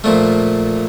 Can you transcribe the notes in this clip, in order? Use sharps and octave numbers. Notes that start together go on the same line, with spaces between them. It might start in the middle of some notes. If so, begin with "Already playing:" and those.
A#2 F3 A3